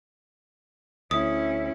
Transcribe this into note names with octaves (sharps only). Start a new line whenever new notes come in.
D2 C#4 E4 D#6